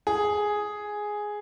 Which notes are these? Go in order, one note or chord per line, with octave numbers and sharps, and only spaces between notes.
G#4